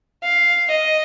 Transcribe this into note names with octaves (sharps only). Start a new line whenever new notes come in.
F5
D#5